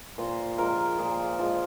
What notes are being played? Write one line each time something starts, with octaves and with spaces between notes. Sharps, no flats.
A#2 C5
F3 G#3 A#4
A#2 G#4
F3 G#3